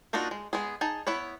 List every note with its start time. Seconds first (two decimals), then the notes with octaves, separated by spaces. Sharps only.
0.13 A#3 D4 D#4 F4 F#4
0.31 G#3
0.53 G#3 B3 G#4
0.81 D#4 G#4 A5
1.07 B3 E4 B4 C#5